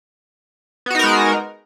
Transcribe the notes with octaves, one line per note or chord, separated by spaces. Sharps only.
G#3 B3 D#4 F#4 A#4